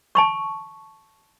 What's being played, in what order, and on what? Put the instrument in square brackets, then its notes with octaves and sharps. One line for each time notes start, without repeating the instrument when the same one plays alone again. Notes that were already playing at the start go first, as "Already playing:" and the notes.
[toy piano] A5 B5 C#6